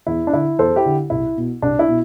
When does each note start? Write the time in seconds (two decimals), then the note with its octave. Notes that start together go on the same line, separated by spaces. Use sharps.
0.07 E2 E4
0.27 D4
0.33 D3 E4
0.59 E2 A4 C5
0.76 E4 G4
0.85 D3
1.10 C2 E4
1.37 B2
1.62 C2 D4
1.79 E4
1.88 B2